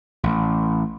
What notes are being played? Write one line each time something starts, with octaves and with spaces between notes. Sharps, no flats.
A1